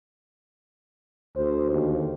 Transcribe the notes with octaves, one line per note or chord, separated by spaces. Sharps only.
D2 C5
D#2